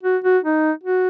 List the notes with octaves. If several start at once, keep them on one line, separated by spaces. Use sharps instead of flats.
F#4
F#4
D#4
F#4